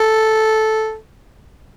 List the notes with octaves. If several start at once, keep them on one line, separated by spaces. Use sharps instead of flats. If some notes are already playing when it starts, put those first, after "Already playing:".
Already playing: A4